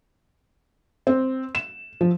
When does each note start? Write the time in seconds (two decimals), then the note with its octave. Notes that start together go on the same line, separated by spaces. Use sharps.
1.07 C4
1.55 E7
2.01 F3